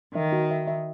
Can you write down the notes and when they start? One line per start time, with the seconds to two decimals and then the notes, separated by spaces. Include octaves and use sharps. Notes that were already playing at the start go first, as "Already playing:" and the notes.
0.15 D#3 E5
0.32 F#4
0.51 E5
0.68 E5